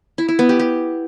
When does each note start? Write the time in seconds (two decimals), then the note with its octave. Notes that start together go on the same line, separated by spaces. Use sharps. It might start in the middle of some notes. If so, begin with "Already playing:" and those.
0.18 E4
0.28 E4
0.39 B3
0.49 G4
0.59 G4